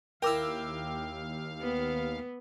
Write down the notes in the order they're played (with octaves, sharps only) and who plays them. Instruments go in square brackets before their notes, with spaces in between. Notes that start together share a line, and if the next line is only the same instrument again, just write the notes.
[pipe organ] D#2 F5 [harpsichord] E4 A#4 [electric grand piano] G5 D6 E6
[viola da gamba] B3